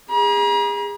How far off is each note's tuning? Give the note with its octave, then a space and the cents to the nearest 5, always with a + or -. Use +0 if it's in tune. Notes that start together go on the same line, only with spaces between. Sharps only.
G#4 -30 A#5 +45